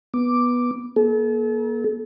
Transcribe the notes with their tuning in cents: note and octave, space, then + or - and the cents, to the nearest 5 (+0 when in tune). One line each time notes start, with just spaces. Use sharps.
B3 -10 D6 +0
A#3 +35 A4 -40